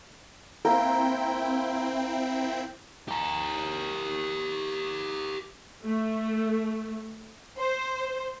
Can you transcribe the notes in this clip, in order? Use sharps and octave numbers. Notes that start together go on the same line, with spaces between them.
A#3 C4 E4 A#4 G5
G4 A#4
A3
C5